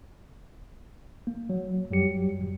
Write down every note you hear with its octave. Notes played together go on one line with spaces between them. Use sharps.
A#3
F#3
F#2 F#3 G3 G4 C#7